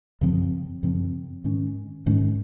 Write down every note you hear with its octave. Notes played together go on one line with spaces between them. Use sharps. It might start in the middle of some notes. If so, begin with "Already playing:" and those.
F#2 C#3 F3 C4
F#2 C#3 F3 C4
G#2 D#3 G#3 C#4
G#2 D#3 G#3 C#4